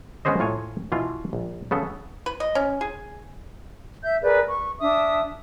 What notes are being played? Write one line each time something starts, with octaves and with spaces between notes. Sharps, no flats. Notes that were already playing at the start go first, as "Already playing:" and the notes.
G#3 B3 C#4 G#4 C5 D#5
A2 F4 C#5 G#5
B2 E3 F4
A#1
C#3 B3 A4
B4
D#5
C#4
G#4
E5 G6
G#4 A#4 B4 D5
C#6
D4 E5 D#6